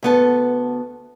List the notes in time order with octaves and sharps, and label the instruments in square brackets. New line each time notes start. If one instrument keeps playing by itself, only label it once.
[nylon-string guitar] D2 B3 A4